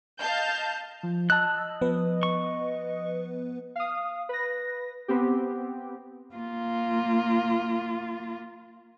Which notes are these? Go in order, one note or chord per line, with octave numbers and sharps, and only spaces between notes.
D#5 F5 A5 G6
F3
D#5 A5 E6 F#6
F3 B3 B4
C#6
F5 D#6
B4 A#6
B3 C4 G4
A#3 F4